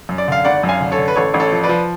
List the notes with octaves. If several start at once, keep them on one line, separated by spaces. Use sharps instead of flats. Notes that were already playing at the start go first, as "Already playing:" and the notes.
F#2
D5
D3 F5
G#1 D5 F#5
F#2
F5 G#5
D3
A4 C#5
D3
B4
A1 A4 C#5
A1
A4 C#5
F3
B4 D5
F3